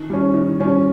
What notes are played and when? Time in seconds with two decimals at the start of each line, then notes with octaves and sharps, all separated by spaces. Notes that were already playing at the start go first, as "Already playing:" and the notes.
Already playing: D#3
0.10 G3 C#4
0.34 D#3
0.60 G3 C#4